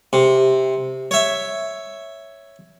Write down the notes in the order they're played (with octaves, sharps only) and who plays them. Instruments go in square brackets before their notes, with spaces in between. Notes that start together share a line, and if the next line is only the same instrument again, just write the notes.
[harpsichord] C3
C#5 E5